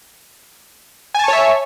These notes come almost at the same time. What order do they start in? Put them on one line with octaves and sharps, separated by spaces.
G#5 A5 C#6 C#5 E5